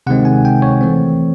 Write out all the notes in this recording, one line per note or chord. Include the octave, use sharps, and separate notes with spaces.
C3 D#3 G#3 C4 F#5
G#5
G5
C#5
E3 A3 C4